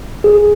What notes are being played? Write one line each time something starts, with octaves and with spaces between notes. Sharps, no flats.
G#4